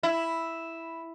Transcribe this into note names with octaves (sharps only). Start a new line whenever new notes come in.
E4